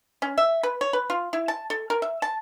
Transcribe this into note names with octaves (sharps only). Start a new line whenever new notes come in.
C#4
E5
B4
C#5
B4
F4
E4
A5
A4
A#4
E5
A5